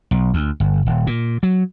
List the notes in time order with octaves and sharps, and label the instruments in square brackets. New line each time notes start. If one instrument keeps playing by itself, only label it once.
[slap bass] B1
D2
G1
D#1
A#2
F#3